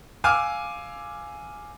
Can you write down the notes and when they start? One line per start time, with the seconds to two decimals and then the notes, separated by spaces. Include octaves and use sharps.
0.24 F5 G#5 D6 E6 F6